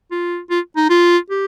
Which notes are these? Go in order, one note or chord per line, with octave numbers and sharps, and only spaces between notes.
F4
F4
D#4
F4
G4